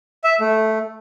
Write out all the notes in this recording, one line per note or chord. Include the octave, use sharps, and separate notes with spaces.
E5
A3